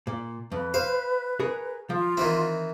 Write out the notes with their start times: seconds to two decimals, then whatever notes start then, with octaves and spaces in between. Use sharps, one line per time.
0.07 A#2
0.52 F2 B4
0.74 C5 F5
1.40 G#4 A#4 C#5
1.90 F3 F4
2.17 D#3 E3 C4 E4